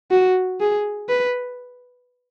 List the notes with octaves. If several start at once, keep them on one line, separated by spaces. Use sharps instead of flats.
F#4
G#4
B4